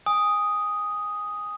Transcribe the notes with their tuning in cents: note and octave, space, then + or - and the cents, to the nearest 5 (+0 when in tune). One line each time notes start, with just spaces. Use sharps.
G#5 -20 D#6 +0